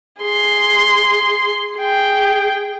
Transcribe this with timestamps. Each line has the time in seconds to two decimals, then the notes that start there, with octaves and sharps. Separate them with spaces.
0.22 G#4 C6
1.78 G#4 G5